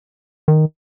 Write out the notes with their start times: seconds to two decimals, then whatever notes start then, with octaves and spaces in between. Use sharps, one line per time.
0.48 D#3